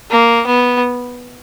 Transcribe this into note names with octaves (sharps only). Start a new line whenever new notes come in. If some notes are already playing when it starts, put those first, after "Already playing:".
A#3
B3